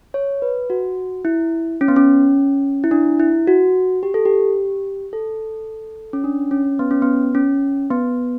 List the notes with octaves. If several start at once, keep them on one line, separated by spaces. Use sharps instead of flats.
C#5
B4
F#4
E4
C#4
B3
C#4
E4
D4
E4
F#4
G4
A4
G4
A4
C#4
D4
C#4
B3
C#4
B3
C#4
B3